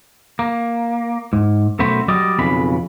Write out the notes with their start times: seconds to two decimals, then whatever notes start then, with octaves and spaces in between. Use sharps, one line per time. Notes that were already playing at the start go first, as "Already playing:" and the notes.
0.39 A#3
1.33 G#2
1.79 F#2 B2 A3 F#4 C5 B5
2.08 F#3 G3 D5 D#5
2.39 B1 F2 C#3 B5